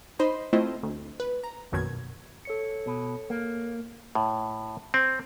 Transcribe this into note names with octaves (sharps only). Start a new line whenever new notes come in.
D#4 C5 D#5 B5 C6
A3 C4 E4 F4 C5 D#5
D2
B4
A#5
A#1 F#2 B2 D#3 G#6
A4 C#5 C#7
B2
A#3
A2
C4